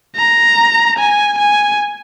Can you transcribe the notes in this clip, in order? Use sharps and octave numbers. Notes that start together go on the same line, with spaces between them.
A#5
G#5
G#5